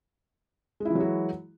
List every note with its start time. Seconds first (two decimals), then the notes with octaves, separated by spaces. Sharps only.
0.80 G#3
0.85 E4
0.90 E3
0.95 F#3
1.00 F#4